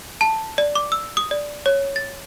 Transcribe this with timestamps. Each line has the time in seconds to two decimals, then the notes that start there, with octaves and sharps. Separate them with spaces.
0.21 A5
0.58 D5
0.75 D6
0.92 E6
1.17 D#6
1.31 D5
1.66 C#5
1.96 A6